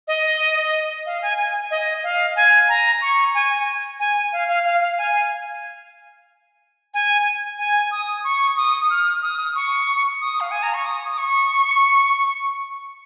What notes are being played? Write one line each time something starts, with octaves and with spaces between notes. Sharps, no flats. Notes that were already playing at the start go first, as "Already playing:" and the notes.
D#5
F5
G#5
G#5
D#5
F5
G#5
A#5
C#6
G#5
G#5
F5
F5
F5
F5
G#5
G#5
G#5
D#6
C#6
D#6
F6
D#6
C#6
D#6
F5
G#5
A#5
C#6
D#6
D#6
C#6